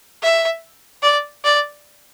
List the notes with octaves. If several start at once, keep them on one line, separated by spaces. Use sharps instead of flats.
E5
D5
D5